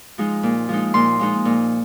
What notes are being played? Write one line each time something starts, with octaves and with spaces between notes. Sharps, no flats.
F3 G#3 D#4
A#2
F3 G#3 D#4
A#2 C6
F3 G#3 D#4
A#2